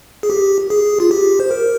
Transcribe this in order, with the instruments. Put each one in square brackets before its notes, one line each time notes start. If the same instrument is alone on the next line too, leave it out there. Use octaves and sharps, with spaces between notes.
[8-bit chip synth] G#4
G4
G#4
F4
G4
C5
A#4